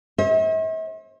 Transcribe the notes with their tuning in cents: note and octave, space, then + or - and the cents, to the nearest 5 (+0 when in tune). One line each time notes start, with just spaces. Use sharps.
C5 +45 E5 -45